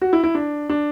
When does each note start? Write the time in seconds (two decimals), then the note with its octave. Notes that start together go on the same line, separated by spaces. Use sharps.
0.02 F#4
0.13 E4
0.24 E4
0.35 D4
0.69 D4